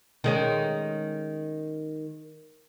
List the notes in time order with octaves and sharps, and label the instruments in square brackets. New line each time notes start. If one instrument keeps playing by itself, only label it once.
[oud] D#3 G#3 C#4